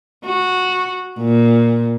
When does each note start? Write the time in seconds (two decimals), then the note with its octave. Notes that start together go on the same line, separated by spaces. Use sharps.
0.25 F#4
1.18 A#2